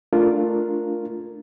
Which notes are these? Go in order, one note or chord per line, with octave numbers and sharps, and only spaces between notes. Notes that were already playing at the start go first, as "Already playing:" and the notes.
A3 D4 F4 A#4